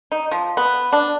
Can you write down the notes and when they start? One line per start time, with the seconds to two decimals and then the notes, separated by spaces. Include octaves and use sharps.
0.12 D#4
0.31 F3
0.57 B3
0.93 D4